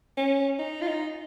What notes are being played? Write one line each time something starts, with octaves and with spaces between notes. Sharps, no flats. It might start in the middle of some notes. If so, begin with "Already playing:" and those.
C#4
D#4
F4
D#4